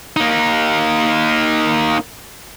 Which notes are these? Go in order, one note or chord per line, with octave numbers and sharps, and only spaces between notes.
A#3 D#4